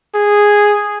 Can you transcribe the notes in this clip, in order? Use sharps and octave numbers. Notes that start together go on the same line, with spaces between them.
G#4